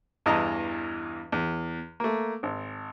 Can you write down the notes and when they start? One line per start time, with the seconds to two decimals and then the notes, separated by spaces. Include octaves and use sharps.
0.26 E2 G2 E3 D#5 A5 A#5
1.32 E2
2.00 A3 A#3
2.43 G#1